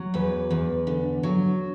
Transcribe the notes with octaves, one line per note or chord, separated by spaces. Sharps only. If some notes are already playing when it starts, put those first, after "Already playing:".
Already playing: F#3
E2 B4
E2
D3
F#3